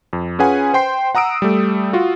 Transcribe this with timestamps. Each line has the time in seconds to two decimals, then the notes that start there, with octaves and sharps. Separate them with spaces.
0.13 F2
0.39 C#4 F4 G#4 B4 F#5 G#5
0.74 C5 G5 C6 C7
1.15 F#5 A#5 D#6 E6 D7
1.42 G3 A3
1.93 F4 F#4